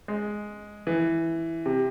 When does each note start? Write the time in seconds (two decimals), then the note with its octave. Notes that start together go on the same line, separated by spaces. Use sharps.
0.08 G#3
0.87 E3
1.66 C3